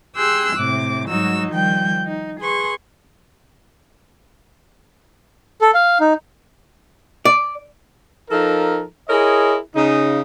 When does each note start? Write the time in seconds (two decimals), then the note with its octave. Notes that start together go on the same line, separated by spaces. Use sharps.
0.14 G4 G#4 C6 E6 F#6
0.55 A2 C3 D6
1.08 G#2 F#3 G3 D#4 F#4 E6
1.50 D#3 F3 G3 G5 G6
2.06 D#4
2.39 G#4 B4 C6 C#6
5.61 A4
5.74 F5
6.00 D#4
7.25 D5
8.30 F3 D#4 A4 A#4
9.09 E4 G#4 A#4 C#5 D#5
9.76 C#3 D#4